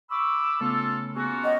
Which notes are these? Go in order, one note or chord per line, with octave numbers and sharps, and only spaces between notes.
B5 C#6 D6 E6
C#3 A3 B3 F4 A4 E6
A#3 B3 C#4 F4 F#4 G#4 C#6
C#5 D#5 F#5 G5 F6